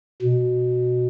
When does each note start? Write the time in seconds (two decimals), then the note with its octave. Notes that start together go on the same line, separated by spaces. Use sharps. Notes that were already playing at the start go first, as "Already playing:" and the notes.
0.22 B2